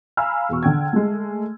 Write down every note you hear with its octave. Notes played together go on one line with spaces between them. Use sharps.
F5 G#5 A#5 B5 E6 F6
E2 B2 C#6
D3 G5 G#6
G#3 A3